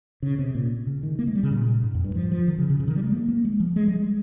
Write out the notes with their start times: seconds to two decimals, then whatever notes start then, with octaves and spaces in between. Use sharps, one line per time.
0.22 C#3
0.39 C3
0.55 A#2
0.87 C#3
1.03 D#3
1.19 A#3
1.27 G#3
1.35 G3
1.43 C#3
1.51 A#2
1.84 G#2
1.94 F2
2.04 G2
2.15 F3
2.32 F3
2.48 D#3
2.58 C#3
2.70 C#3
2.80 C#3
2.88 D#3
2.96 G3
3.04 G#3
3.12 A#3
3.28 A#3
3.45 G#3
3.60 F3
3.76 G#3
3.88 G3
4.00 G#3